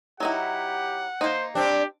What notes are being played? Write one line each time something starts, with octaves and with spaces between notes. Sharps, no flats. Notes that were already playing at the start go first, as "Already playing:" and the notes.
F#3 D#4 E4 G4 F#5
A#3 D#4 C5
C4 D4 G4